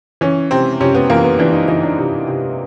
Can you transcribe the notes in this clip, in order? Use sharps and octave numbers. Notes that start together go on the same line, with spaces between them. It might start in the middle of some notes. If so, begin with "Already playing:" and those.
E3 C#4
C3 C4
C3 C#4
B3
E3 A#3
B3
E3 D4
D#4
E3 D#4
D4
C3
C3